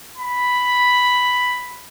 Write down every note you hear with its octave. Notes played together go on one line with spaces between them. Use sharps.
B5